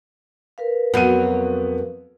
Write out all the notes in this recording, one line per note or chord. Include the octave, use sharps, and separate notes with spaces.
A#4 B4 F5
F2 F#3 B3 D#7